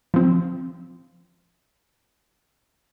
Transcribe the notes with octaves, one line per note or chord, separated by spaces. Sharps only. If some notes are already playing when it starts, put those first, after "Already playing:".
F3 C4